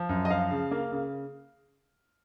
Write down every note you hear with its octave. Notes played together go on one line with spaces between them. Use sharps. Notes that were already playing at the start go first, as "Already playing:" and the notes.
Already playing: F3
F#2
D#5
F3 F5
C#3
A#3
C#3